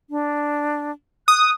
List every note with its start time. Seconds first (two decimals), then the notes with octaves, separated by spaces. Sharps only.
0.10 D4
1.28 D#6 F#6